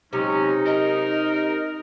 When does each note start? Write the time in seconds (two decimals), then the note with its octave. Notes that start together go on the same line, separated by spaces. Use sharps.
0.13 C3 F#3 G#3 C#4 D#4
0.66 A#4 D#5